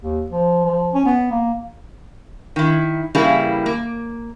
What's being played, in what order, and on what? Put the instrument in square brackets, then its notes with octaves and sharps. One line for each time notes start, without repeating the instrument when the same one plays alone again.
[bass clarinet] D#2
F3
F3
C#4
B3
A#3
[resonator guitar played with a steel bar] D#3 E4
C#3 E3 G3 A#3 E4 G#4
A#3